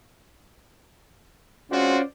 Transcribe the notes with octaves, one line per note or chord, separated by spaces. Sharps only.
G#3 C4 C#4 F4 F#4 C5 D5